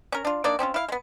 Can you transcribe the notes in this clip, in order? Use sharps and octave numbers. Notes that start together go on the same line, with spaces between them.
C#4 A#4
D4 F4
A#3 D4 D#4 D5
C4 C#4 D#4 F4
E4 F5
G#3 B3